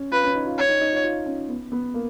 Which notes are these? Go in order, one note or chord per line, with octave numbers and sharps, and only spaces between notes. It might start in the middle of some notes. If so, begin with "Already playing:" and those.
Already playing: C#4
F4 B4
C#4
D#4
F4
C#5
D#4
D#4
F4
F4
C#4
B3
B3
A#3